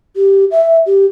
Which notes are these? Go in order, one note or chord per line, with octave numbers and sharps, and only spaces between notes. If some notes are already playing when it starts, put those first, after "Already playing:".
G4
E5
G4